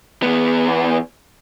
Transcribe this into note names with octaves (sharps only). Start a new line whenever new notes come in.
E2 B3